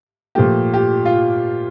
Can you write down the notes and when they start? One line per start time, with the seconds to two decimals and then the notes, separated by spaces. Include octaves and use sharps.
0.35 A#2 F3 A3 G4
0.74 G4
1.06 F4